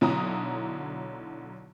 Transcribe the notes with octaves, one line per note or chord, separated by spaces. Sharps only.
B1 D3 F#3 E4 A#5 D#6